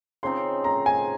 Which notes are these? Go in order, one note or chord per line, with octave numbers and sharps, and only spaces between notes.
C#3 F3 C4 D#4 C6
A#5
G#5